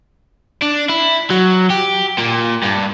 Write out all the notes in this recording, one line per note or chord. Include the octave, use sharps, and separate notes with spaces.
D4
E4
F#3
G4
A#2
G2